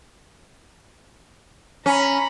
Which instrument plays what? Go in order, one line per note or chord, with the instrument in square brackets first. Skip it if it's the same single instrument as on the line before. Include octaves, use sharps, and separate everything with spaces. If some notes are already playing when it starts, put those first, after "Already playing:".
[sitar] C#4 [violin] A#5 B5